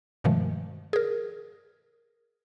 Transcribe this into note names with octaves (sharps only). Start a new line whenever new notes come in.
G2 B2 D#3 F3 G#3 A3
G#4 A#4